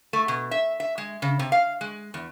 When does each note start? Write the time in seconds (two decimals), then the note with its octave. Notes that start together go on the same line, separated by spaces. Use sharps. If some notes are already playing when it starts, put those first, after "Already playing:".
0.13 A3
0.28 B2
0.51 E5
0.80 E5
0.98 G#3
1.22 C#3
1.39 C3
1.52 F5
1.81 G#3
2.14 E2